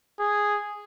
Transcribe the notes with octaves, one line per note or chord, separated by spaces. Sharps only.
G#4